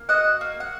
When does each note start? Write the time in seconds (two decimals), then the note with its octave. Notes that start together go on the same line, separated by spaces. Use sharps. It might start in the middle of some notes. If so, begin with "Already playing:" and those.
Already playing: A#3
0.09 F#4 D#5 F#5
0.41 A#3
0.60 F#5